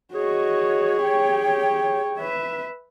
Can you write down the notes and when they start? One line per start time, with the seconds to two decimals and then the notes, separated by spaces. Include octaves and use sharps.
0.14 F#4 G#4 C#5 D#5
1.03 G4 G5
2.18 B4 E5